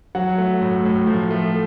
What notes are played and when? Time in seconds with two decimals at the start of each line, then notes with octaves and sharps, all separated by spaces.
0.15 F#3 F#5
0.38 A3
0.62 A2
0.85 A2
1.07 F3
1.31 A3